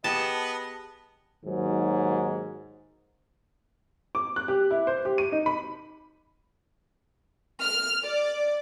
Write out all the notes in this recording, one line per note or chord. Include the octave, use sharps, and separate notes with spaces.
B3 G4 G#4 D#5 F#5 A5
D#2 G#2 D#3 F#3
D6
F#6
G4
E4
C5
G4
D#7
D#4
B5
F6
D5